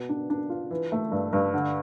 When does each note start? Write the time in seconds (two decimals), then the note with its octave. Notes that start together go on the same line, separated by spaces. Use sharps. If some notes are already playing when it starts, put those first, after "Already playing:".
Already playing: B2
0.09 D4
0.30 D4
0.50 F4
0.71 E3
0.92 A3
1.12 G2
1.33 G2
1.54 D3